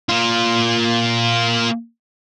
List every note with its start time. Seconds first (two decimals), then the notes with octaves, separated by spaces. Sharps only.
0.09 A#3 F4